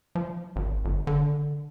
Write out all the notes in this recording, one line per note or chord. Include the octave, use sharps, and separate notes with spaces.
F3
G#1
G1
D3